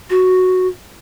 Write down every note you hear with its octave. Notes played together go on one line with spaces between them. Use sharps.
F#4